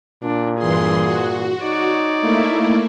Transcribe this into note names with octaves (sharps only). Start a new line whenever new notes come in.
A#2 D4
G2 E3 G#4 C6
F#4
D#4 C#5 D5
A3 A#3 E4